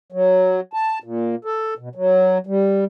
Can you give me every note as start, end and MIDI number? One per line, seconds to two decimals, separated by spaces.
0.12 0.60 54
0.73 0.99 81
1.04 1.35 46
1.45 1.74 69
1.78 1.89 47
1.95 2.38 54
2.47 2.84 55